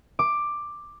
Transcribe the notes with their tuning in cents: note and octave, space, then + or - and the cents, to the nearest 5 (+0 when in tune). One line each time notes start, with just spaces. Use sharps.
D6 +10